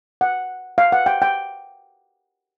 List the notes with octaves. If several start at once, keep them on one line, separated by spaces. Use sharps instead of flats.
F#5
F5
F#5
G5
G5